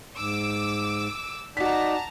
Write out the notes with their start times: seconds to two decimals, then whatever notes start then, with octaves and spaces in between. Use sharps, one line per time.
0.16 G#2 D6 E6
1.57 D#4 F#4 D5 A5 A#5 B6